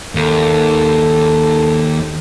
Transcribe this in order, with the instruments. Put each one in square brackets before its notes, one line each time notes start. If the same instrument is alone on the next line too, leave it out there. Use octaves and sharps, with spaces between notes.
[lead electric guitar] D#2 [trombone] A4